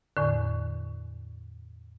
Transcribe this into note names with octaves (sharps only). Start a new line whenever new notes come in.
E2 A2 D3